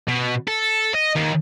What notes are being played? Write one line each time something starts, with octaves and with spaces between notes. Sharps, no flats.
B2
A4
D#5
D#2